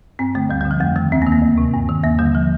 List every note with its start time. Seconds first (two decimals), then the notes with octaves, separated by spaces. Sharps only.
0.19 G2 C4
0.35 D3 A3
0.49 D2 G3
0.61 D3 G3
0.71 F3
0.80 F2 A3
0.96 D#3 A3
1.12 D#2 C4
1.22 A#3
1.26 D#3
1.32 A#3
1.42 D2
1.58 C3
1.74 G2
1.89 D#3
2.04 D#2 A#3
2.19 D3 G3
2.35 F3